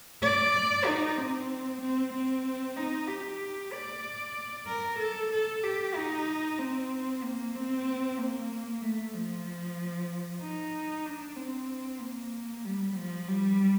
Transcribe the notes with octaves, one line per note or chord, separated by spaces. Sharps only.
D5
D#4
C4
C4
C4
D#4
G4
D5
A#4
A4
A4
G4
D#4
C4
A#3
C4
A#3
A3
F3
D#4
D4
C4
A#3
G3
F3
G3